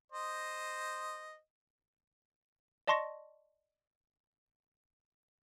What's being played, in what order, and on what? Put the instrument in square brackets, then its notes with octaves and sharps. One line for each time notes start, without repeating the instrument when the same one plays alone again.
[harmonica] C5 D#5
[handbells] D5 D#5 A5 C6 C#6 A#6